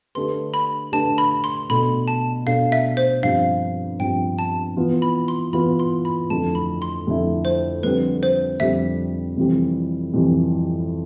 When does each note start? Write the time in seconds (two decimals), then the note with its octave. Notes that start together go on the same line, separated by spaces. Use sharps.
0.15 D3 A3 D4 G4 B4 C6
0.54 B5
0.92 D3 A3 D4 G4 B4 A5
1.18 B5
1.44 C6
1.70 B2 A3 D4 A4 B5
2.08 A5
2.46 B2 A3 D4 A4 F5
2.72 E5
2.97 C5
3.23 G2 F3 C4 G4 F5
3.99 G2 F3 C4 G4 G5
4.39 A5
4.76 E3 B3 F4 B4
5.02 B5
5.28 C6
5.53 E3 B3 F4 B4 B5
5.79 C6
6.05 B5
6.30 F2 D3 A3 E4 A5
6.55 B5
6.82 C6
7.07 F2 D3 A3 E4
7.45 C5
7.83 F2 D3 G3 C4 B4
8.23 C5
8.60 F2 D3 G3 C4 E5
9.37 F2 C3 E3 G3 C4
10.14 F2 C3 E3 G3 C4